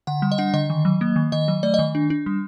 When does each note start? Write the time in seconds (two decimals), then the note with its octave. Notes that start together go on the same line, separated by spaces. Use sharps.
0.07 D3 F#5
0.22 G3
0.32 D#5
0.38 D4 F#5
0.54 D3 D#5
0.70 D#3
0.85 F#3
1.01 A#3
1.16 D#3
1.32 D#3 D#5
1.48 F#3
1.63 A3 D5
1.74 D#3 D#5
1.95 D4
2.10 D4
2.26 G3